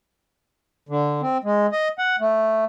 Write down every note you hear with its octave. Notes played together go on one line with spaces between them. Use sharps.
D3
C4
G#3
D#5
F#5
A3